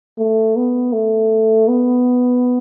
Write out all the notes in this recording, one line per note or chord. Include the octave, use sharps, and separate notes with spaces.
A3
B3
A3
B3